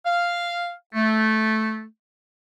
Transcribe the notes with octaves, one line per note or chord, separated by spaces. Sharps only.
F5
A3